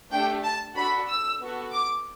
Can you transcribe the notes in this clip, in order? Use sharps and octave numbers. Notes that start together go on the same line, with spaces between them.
A3 D4 G4 G5
A5
D4 F#4 A4 B5
E6
B3 F#4 A4
D6